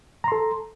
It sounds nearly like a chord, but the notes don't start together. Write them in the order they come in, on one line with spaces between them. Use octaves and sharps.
A#5 C6 A4